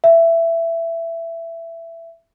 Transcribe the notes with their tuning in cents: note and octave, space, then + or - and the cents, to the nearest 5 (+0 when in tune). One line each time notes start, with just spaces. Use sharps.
E5 +15